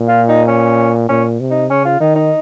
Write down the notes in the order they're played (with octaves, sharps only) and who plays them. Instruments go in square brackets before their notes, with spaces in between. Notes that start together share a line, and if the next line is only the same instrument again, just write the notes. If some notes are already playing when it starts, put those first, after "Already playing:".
Already playing: [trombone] A#2
[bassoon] F4
D#4
C#4
[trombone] A#2 [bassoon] C#4
[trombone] C3
[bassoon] D#4
[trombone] C#3 [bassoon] C#4
[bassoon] F4
[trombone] D#3 [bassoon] D#4
[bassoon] D#4